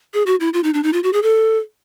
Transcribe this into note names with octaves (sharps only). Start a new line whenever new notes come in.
G#4
F#4
E4
F4
D#4
D4
D#4
F4
F#4
G#4
A4